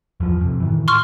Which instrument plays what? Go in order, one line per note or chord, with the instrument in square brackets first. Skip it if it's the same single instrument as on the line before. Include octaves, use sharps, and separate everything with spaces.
[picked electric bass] E2 F3
F2 C3
A2 D#3 E3
[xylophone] C6 C#6 F6